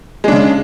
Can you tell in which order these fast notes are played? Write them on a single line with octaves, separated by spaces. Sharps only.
G#3 D4 C#3